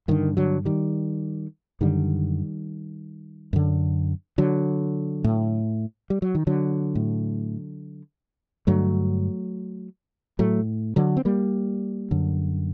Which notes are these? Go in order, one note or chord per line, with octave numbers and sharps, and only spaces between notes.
G2 D3 D#3
D3 F#3
D#3 G3
F#2 D3 D#3 G3
F#2 D3
D3 F#3
A2
G3
F#3
D#3
D3 F#3
A2
G2 D3 F#3 A3
A2 F#3 A3
D3 F#3
C4
G3 A#3
F#2 D3